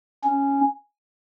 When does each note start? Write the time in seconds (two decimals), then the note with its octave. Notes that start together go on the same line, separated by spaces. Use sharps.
0.24 C#4